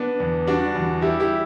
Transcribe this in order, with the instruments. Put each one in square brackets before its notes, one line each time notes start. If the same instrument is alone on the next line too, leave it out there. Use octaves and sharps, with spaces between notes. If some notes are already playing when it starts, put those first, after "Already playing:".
Already playing: [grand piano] B3 D4
E2
G3 D4 F#4
E2
G3 E4 G4
E4 G4